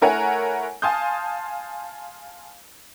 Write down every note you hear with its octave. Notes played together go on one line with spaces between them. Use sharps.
A3 E4 A#4 C#5 F#5 G#5
F5 G#5 A5 C6 D#6 G6